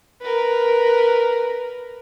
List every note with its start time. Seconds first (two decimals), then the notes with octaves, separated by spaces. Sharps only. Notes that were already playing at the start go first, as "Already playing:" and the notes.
0.22 A#4 B4